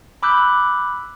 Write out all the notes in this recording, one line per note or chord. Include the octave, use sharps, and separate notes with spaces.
B5 D6 E6 F#6 G6